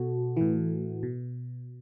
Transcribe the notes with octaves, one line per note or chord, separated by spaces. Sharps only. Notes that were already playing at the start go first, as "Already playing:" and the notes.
Already playing: B2 F#4 A4
A2 E3
B2